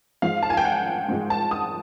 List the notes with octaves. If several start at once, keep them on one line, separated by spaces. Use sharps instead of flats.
G#2 F3 G#3 F5
A5
G#5
G5
F#5
G#2 F3 G#3
A5
D#6